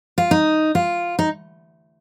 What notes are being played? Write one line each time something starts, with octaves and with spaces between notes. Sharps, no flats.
F4
D#4
F4
D#4